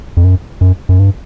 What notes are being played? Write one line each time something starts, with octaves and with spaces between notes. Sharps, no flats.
F2
F#2
F#2
F#2
G2